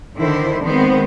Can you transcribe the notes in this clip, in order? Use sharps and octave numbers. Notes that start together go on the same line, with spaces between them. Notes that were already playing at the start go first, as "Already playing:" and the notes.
D3 D#3 E4 C5
D#3 G#3 B3 C4 C5